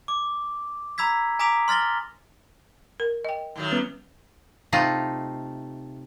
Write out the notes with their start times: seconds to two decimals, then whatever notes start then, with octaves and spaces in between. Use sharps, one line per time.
0.08 D6
0.98 A#5 B5 E6 G#6 B6
1.39 G#5 A#5 D6 D#6 B6 F7
1.68 C6 F6 A6 A#6 G7
3.00 A#4
3.25 D#5 G5
3.56 A2 D#3 F#3
3.72 G3 B3 C#4 B4
4.72 C3 A3 D#4 F4